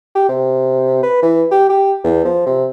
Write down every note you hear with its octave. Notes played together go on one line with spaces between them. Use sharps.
G4
C3
B4
E3
G4
G4
E2
F3
C3